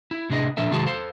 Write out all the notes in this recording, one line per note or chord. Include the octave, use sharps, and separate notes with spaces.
E4
A2 C3 D4 G#4 D#5
A#2 F3 D4 A4 E5
C3 D#3 G#3 F#4 G#4 A5
A4 C5 F5